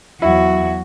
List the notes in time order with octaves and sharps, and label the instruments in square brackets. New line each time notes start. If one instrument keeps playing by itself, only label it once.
[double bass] E2 F#3 [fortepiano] E4 [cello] F#4